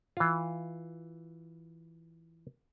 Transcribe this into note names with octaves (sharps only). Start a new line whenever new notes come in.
E3 F4